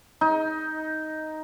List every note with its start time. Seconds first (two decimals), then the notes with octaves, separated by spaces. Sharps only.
0.21 D#4